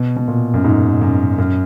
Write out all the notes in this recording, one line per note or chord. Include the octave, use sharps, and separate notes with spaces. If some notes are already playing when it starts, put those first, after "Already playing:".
Already playing: B2
B2
A#2
F#2
G#2
F#2
F#2